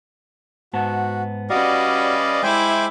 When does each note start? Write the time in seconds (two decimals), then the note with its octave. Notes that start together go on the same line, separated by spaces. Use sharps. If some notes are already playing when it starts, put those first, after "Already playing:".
0.73 G#2 B3 F#4 A5
1.50 G3 C#4 F#4 B4 D5 D#5 F5
2.43 G#3 E4 C5 E5 G5 G#5 D6